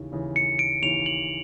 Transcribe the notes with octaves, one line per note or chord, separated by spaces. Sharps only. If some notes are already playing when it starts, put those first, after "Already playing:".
Already playing: D#2 C#3 E3
D#2 C#3 E3
C#7
D7
D#2 C#3 E3 F7
F#7